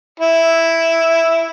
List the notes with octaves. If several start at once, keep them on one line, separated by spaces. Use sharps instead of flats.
E4